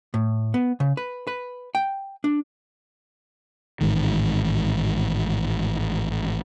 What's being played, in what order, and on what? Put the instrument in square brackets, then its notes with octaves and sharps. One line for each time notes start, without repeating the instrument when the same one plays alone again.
[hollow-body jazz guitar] A2
B3
C#3
B4
B4
G5
D4
[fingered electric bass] A1 G#2 D#3